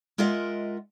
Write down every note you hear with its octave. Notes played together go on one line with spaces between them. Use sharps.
G#3 F4 A#4 D#5 E5 F#5